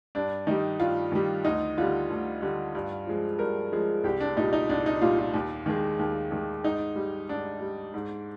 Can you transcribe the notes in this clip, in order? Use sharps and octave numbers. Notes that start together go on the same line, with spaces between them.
G2 D4
D#3 G3 D#4
G2 F4
D#3 G3
D2 D#4
D3 G3 F4
D2
D3 G3
G2
F3 G#3
G2 A#4
F3 G#3
C2 G4
D4
A#2 G3 D#4
D#4
C2 D4
D#4
A#2 G3 F4
F4
D#2
D#3 G#3
D#2
D#3 G#3
G#2 D#4
G3
G#2 D4
G3
G#2